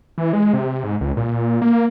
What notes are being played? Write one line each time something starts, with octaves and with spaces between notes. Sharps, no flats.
E3
G#3
C3
G#2
C#2
A#2
A#3